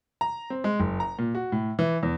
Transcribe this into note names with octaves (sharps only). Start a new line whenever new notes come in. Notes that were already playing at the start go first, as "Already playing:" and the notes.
A#5
C4
G#3
F#1
A#5
A#2
F#4
A2
E3
E2